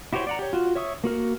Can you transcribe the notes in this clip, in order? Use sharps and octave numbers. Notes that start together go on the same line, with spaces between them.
E4 F#4 G4 C5 C#5
D5 F#5 A#5
G4 C#5
F4 F#4
C#5 E5 C#6 D#6
A#3 F#4 A#4